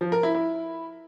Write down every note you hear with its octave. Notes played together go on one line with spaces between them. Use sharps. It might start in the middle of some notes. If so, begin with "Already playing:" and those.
F3
A#4
E4
E4